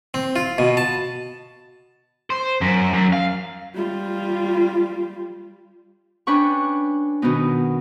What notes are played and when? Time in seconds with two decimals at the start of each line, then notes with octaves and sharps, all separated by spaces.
0.14 C4
0.36 F4
0.58 B2
0.77 A5
2.30 C5
2.62 F#2
2.94 F#2
3.13 F5
3.75 G3 F4
6.27 C#4 D4 B4 G5 C#6
7.22 B2 D#3 B3 D#4